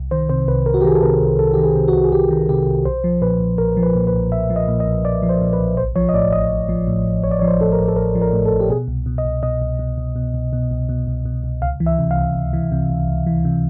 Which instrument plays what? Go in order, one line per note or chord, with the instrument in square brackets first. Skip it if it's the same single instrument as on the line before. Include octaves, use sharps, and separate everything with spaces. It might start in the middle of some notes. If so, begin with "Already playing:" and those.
Already playing: [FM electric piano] C2
D#3 C5
C3 C5
C2 B4
C2 A#4
F#4
G4
D#3 G#4
A4
C3 A#4
C2
C2 A4
D#3 G4
G#4
C3
F#4
C2
G#4
C2 G4
D#3
C3 G4
C2
B1 C5
F3
A#2 B4
B1
B1 A#4
F3
B4
A#2
B4
B1
B1 E5
F3
D#5
A#2
D#5
B1
B1 D5
F3
C5
A#2
B4
B1
A1 C5
F3 C#5
D#5
A2 D5
A1 D#5
A1
F3
A2
A1
A1 C#5
D5
C#5
F3
C5
A2 A4
A#4
A1
A4
A1 A#4
F3
A#4
A2
A4
A1
G4
B2 G#4
C2
B2
D#5
C2
B2 D#5
C2
B2
C2
B2
C2
B2
C2
B2
C2
B2
C2
C#2 F5
E3
E5
C3
F5
C#2
C#2
E3
C3
C#2
C#2
E3
C3